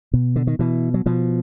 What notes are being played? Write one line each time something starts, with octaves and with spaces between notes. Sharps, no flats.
B2
D3
D#3
B2 E3
F#3
B2 F3